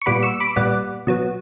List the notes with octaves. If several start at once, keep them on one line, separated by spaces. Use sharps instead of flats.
C#6
A#2 G3 B3 B5 D6
C#6 E6
B5 D6
A#2 G3 B3 D5 F#5
B2 F#3 B3